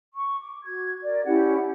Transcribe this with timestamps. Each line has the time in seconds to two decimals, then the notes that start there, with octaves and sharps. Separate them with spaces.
0.14 C#6
0.41 D6
0.64 F#4 G#6
1.03 A#4 D5
1.25 C#4 E4 G4 F#5